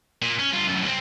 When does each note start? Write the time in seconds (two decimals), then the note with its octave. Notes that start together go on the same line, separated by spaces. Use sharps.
0.22 A#2
0.39 C#4
0.53 G2 F4
0.66 F#2 A2
0.84 C2 C4